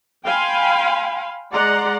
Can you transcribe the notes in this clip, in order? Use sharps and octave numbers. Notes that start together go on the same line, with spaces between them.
F5 G5 G#5 B5 C6
G#3 D5 F#5 A#5 C6